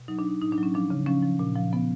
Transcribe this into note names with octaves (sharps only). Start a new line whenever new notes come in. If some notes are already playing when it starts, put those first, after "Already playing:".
Already playing: B2
F#3 D#4
D4
F#3 D#4
A2 D#4
D4
F#3 C#4
F3 D4
C#3
F3 C#4
F3
A#2
F3
F3 B3